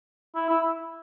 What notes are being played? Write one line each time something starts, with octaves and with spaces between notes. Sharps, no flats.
E4
E4